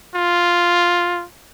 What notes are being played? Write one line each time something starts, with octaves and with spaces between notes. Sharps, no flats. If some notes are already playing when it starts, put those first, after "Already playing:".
F4